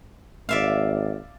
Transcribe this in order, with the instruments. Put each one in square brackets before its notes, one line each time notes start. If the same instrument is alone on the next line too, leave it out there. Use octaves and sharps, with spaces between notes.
[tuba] G#1 [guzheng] D5 E5 F5